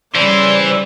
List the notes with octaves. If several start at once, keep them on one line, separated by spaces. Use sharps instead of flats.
C#3 E3 G3 C5 D5